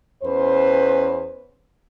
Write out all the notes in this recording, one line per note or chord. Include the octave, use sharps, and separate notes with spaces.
E2 C#4 B4 C5